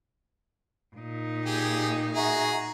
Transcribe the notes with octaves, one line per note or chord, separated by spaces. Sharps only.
A#2 D#4
G4 G#4
F#4 G#4 E5 A#5